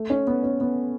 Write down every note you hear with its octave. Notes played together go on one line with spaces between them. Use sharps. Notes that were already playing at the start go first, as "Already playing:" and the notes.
Already playing: A3
C#4
B3
C#4
B3